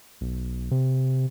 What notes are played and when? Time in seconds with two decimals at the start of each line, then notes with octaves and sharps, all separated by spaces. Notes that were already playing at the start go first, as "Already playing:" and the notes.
0.21 B1
0.71 C3